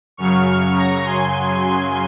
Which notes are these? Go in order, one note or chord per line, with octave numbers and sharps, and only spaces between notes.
F#2 C#3 F#3 C#6 F6
C#6 F6
A#5 C#6
G#5 C6